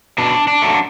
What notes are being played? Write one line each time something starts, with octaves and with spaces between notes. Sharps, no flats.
B2 D4
D4
F#3 A3